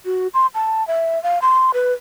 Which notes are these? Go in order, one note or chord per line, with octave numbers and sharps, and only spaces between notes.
F#4
C6
A5
E5
F5
C6
B4